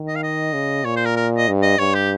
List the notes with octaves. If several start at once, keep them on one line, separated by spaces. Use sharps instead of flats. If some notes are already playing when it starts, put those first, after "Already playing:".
Already playing: D#3
D#5
F5
D#5
C#3
A#2 C#5
C5
A#4
A#4
D#5
G2
D#5
G2 C#5
G4